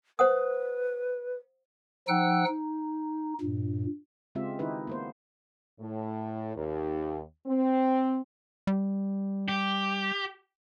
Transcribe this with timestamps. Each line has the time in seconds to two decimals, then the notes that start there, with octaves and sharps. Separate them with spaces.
0.19 B4 C5 F#5 D#6
2.08 F3 D#4 F#5 G5 E6 F#6
2.47 D#4
3.41 G2 A#2
4.35 C#3 G#3 C4 F4 G4 E5
4.59 D#3 D#4 E4 G4 B4
4.87 A#3 B3 C5
5.80 A2
6.56 D#2
7.47 C4
8.67 G3
9.49 G4